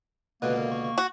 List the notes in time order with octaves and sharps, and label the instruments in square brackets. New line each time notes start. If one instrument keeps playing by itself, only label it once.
[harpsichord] C#2 B2 D3 [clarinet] A#3 [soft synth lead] B4
[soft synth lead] A#4
C#6
C#6
[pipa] F#4